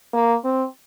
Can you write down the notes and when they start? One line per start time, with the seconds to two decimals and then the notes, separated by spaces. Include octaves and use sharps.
0.13 A#3
0.44 C4